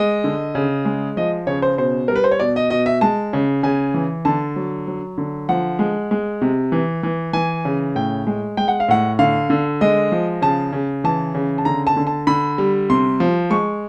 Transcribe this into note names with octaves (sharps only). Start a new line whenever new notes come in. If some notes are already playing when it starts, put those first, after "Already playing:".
Already playing: G#3 D#5
D3
C#3
G#3
F3 D#5
C#3 C#5
C5
B2 C5
G3 A#4
B4
C5
C#5
B2 D5
D#5
B2 D#5
E5
G#3 A5
C#3
C#3 G#5
E3
D3 A5
F#3
F#3
D3
F3 F#5
G#3
G#3
C3
E3
E3
E3 G#5
C#3
A2 G5
G#3
G#3 G5
F#5
F5
A2 F#5
D3 F5
D3
G#3 D#5
F3
C#3 A5
C#3
E3 A5
C#3
A5
D3 A#5
A5
D3
A5
D3 B5
G3
C3 C6
F3
G#3 C#6